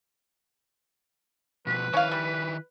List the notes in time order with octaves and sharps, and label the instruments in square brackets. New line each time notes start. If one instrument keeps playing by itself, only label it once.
[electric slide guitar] B2 F3 [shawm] B4
[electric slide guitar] D#3 E4 E5 [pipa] C#4 F5
[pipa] G3